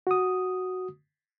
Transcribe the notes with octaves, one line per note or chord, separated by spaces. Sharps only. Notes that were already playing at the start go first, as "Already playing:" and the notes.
F#4 D#6